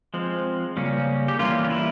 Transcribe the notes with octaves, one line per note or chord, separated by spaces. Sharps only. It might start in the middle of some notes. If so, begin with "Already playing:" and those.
F3 G#3 C4
C#3 G3 A#3 C#4
G4
E3 G3 A#3 C#4 F4
F4
E4